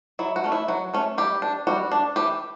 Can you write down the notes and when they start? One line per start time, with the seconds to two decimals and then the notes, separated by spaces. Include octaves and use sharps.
0.19 F#3 E4
0.36 F#4
0.44 A3 C#4
0.52 E4
0.68 F#3 F#4
0.94 A3 C#4
1.18 G3 G4
1.42 D4
1.67 G3 F#4
1.92 D4
2.16 E3 G4